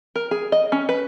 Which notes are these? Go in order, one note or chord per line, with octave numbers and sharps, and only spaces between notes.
A#4
G#4
D#5
C#4
B4